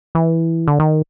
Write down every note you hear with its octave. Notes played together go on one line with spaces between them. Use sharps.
E3
D3
D#3